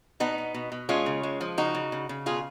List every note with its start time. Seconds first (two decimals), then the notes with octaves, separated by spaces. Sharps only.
0.20 B2 B3 D#4
0.38 B2
0.54 B2
0.72 B2
0.89 G#3 C#4 F4
1.06 C#3
1.23 G#3
1.41 F3
1.58 C#3 D#4 F#4
1.74 C#3
1.92 C#3
2.09 C#3
2.26 B2 F4 G#4